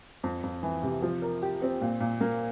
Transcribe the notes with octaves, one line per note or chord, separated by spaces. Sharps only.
F2
F2
E3
C3
F3
A#4
G4
C4
A#2
A#2
A#3